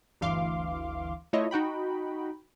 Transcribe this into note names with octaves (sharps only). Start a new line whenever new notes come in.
G1 D2 E3 F5 C6 D6
A3 E4 F4 C#5 D#5
D#4 F#4 G5 B5